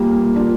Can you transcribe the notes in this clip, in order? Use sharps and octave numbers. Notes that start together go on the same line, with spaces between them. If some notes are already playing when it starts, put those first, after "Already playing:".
Already playing: A#2 G3 A#3
D4 F4